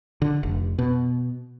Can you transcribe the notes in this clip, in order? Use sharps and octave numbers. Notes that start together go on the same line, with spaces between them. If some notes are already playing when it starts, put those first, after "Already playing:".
D3
F1
B2